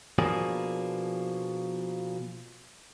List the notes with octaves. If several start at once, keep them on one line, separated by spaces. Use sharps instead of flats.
B2 F3 A#3 D4 G#4